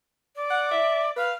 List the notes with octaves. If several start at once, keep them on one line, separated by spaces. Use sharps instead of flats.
D5
F#5
E5
B4 F5